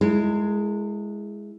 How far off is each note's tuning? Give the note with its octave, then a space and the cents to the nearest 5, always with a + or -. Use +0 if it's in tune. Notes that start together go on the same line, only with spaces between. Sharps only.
G#3 +0 E4 +10 A#4 -45